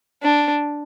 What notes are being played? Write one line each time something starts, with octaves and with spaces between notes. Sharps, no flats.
D4